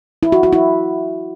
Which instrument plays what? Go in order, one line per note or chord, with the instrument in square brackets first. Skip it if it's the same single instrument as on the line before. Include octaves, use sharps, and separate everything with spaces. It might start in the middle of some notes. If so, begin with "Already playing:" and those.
[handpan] E4
F#4
F#4
E4